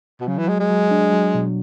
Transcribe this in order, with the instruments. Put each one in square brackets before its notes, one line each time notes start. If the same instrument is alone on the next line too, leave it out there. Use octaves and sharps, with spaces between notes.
[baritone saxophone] B2
[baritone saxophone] C#3 [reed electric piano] F#3
[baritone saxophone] E3
[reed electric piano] F#3 [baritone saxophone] G#3
[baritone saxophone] G#3
[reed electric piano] F#3
D4
F#3
B2